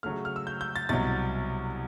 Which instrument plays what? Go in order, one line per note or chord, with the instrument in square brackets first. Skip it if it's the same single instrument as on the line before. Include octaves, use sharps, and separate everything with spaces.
[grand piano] C#3 F#3 A3 F6
F6
E6
G6
G6
A6
C2 B2 F#3 A6